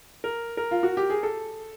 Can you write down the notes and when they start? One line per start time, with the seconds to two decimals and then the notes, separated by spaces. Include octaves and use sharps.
0.24 A#4
0.57 A#4
0.71 F4
0.83 F#4
0.97 G4
1.10 G#4
1.23 A4